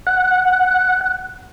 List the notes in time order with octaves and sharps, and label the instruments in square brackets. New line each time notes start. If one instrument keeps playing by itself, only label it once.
[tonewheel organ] F#5